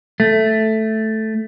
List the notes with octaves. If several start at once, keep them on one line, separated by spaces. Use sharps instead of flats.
A3